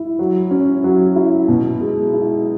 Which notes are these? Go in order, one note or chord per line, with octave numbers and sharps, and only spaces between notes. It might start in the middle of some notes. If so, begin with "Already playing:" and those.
Already playing: E4
F#3
C#4
F#3
E4
B2
G#3
E4